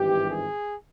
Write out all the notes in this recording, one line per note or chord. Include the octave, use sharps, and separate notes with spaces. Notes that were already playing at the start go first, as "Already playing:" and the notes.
Already playing: G#1 G2 E3 G4
G#4